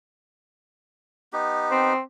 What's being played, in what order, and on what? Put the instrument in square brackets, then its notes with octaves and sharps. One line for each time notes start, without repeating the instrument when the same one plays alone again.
[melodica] B3 D#4 G4
[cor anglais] C4